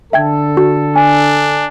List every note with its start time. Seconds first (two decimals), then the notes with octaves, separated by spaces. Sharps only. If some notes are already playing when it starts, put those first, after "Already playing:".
0.13 D3 A4 E5 G5 G#6
0.57 F#4
0.96 D4 G#5